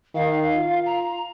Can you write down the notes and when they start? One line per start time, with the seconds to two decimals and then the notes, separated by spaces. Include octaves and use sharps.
0.15 D#3 F5
0.55 F4
0.86 A#5